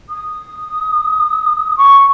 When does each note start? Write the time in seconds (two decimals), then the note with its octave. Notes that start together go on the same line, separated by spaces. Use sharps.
0.09 D#6
1.77 C#6